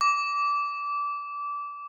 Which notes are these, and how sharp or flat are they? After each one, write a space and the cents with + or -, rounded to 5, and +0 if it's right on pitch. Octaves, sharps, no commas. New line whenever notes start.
D6 -20